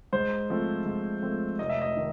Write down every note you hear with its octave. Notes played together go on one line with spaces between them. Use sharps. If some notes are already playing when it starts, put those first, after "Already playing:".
G#2 C5
F3 A3 C4
G#2
F3 A3 C4
F1 D#5
E5
D#5
D#3